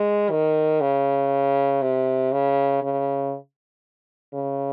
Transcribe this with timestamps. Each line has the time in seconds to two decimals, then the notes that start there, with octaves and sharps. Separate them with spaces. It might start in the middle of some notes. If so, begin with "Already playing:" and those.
Already playing: G#3
0.30 D#3
0.81 C#3
1.82 C3
2.32 C#3
2.82 C#3
4.33 C#3